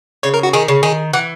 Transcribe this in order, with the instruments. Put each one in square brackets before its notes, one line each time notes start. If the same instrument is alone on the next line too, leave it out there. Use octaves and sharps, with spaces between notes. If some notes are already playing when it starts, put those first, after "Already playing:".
[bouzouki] C#3 [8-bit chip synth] C#5
[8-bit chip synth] A#4
F#4
[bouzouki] D#3 [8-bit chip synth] G#4
[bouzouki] C#3
[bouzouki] D#3 [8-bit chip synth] G#4
[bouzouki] E3 [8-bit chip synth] F#5